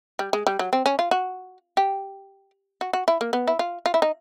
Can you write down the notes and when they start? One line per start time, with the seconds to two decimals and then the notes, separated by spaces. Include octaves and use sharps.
0.19 G3
0.33 G#3
0.47 G3
0.59 F#3
0.73 C4
0.86 C#4
0.99 F4
1.11 F#4
1.77 G4
2.81 F#4
2.93 F#4
3.08 E4
3.21 A#3
3.33 B3
3.48 E4
3.59 F4
3.86 F4
3.94 E4
4.02 D#4